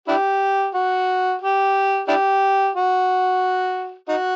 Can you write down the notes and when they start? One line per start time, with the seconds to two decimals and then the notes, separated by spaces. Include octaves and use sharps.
0.08 D4 E4 G4
0.75 F#4
1.42 G4
2.08 D4 E4 G4
2.75 F#4
4.09 D#4 F#4